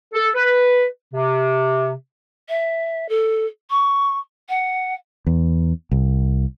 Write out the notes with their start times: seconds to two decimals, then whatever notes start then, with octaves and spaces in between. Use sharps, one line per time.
0.14 A4
0.35 B4
1.14 C3
2.48 E5
3.08 A4
3.70 C#6
4.49 F#5
5.27 E2
5.91 C2